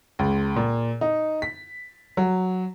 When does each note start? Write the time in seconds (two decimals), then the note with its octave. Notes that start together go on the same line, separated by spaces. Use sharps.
0.19 C#2
0.56 A#2
1.01 D#4
1.42 B6
2.17 F#3